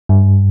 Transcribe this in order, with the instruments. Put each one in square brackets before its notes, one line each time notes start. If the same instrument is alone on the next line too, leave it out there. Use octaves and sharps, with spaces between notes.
[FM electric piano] G2